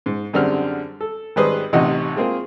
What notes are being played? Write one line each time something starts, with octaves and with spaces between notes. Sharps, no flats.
G#2
F#2 D3 G3 C4 G#4 F6
A4
G#1 G3 G#4 B4 C5 D#6
A1 C3 D#4 D#5 F#5
G#3 A#3 C4 F4 G#4